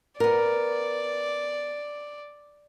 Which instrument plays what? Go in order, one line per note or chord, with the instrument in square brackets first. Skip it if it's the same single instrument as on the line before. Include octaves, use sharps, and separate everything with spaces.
[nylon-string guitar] B3 A#4 [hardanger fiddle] D5